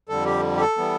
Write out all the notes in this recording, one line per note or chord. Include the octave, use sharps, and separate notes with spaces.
F2 D3 G3 A4
G4
G4
A4
E3 G3 B3